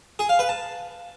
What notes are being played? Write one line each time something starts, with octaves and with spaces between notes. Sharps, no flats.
G#4
F5
B4
A5